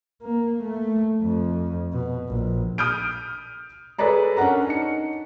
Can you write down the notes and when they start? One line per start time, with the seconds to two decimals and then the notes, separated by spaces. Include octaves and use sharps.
0.22 A#3
0.62 A3
1.22 F2
1.93 B2
2.28 A#1
2.78 D#6 F6 G6 D7
3.99 G#4 A4 B4 C#5 D5 A#5
4.37 C#4 D4 A#4 F#5 A#5
4.67 D#4 C#7